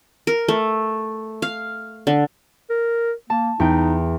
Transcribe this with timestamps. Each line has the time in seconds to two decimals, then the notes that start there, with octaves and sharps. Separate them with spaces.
0.27 A#4
0.48 A3
1.42 F5
2.07 D3
2.70 A#4
3.30 A#3 A5
3.60 E2 D#4 G5